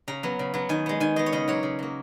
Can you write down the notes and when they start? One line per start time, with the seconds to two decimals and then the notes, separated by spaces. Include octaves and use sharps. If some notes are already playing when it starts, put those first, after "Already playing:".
0.08 C#3 A#5
0.23 F#3 B3
0.39 C#3
0.54 F#3 B3
0.69 D#3 G#5
0.86 G#3 B3
1.00 D#3 G#5
1.16 G#3 B3 D#5
1.26 C#5
1.32 C#3 D#5
1.48 F#3 A#3 C#5
1.63 C#3
1.79 F#3 A#3